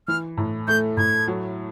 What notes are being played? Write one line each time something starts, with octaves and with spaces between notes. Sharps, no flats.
E3 F6
A2
A3 G6
A2 G#6
F#3